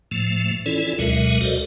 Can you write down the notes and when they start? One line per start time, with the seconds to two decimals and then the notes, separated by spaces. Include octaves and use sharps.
0.11 A2 F3 A3
0.66 E3 C#4 E4 F4 A4 D5
0.99 D2 B2 F#3 G#3 A#4 E5
1.41 F#4 A4 A#4 C5 D5 D#5